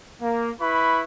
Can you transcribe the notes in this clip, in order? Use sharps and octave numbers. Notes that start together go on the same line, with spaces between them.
A#3
E4 B4 B5 C#6